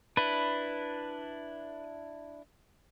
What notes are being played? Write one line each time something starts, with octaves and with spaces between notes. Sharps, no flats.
D4 E4 B4